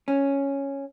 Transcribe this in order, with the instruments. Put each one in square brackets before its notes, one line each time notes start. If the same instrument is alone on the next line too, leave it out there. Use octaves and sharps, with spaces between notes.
[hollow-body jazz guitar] C#4